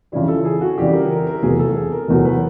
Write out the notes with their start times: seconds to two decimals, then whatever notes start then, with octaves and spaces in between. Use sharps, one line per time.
0.12 F2 C#3 E3 G3 E4
0.28 A4
0.45 G#4
0.61 F#4
0.78 F2 C#3 E3 G3 G4
0.93 A#4
1.10 A#4
1.27 A#4
1.43 F1 E2 B2 F#3 G#4
1.59 A4
1.76 G#4
1.92 A#4
2.08 F1 E2 B2 F#3 A#4
2.25 B4